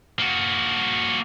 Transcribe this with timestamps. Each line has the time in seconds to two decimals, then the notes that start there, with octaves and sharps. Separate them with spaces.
0.19 A#3 F#4